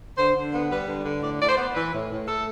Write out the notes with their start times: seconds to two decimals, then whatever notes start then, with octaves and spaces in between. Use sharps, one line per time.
0.17 D3 C5
0.34 D3
0.52 B3
0.69 G3 B4
0.87 D3
1.05 D3
1.22 A2 D5
1.39 A2 D5
1.49 C5
1.57 B3
1.75 E3 B4
1.92 A2
2.10 A2
2.28 A3 A4